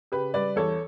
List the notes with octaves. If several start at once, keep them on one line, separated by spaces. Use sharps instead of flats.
C#3 G4 B4
G3 B4 D5
E2 A4 C#5